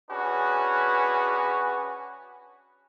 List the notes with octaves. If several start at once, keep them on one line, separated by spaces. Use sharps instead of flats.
C#4 D4 F#4 G#4 B4